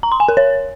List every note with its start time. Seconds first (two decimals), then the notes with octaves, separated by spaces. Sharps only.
0.03 A#5
0.12 C6
0.20 G#5
0.29 A#4
0.37 C#5